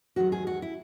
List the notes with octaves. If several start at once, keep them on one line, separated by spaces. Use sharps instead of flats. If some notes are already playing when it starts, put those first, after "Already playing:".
E2 D#3 F#3 F#4
G#4
F#4
E4